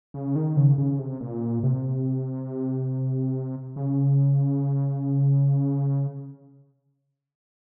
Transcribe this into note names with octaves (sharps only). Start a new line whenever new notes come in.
C#3
D#3
C#3
C#3
C3
A#2
C3
C#3